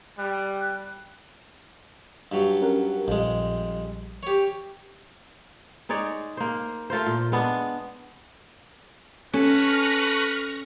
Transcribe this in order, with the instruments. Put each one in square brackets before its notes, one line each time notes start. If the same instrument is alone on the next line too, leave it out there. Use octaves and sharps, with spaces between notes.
[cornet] G3 [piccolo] F#6
[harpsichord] G2 F#3
[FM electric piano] C#4 A#4 F#5
[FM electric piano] A#1 G3 [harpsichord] F2 G#3
[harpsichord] G4 C#5
[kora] G#3 D#4 C#5 D5
A#3 C5
A3 F4 A#4 C5
A#2
G#3 B3 D4
[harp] C#4 [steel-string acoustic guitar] A4 [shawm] B4 [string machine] C#6 F6 A#6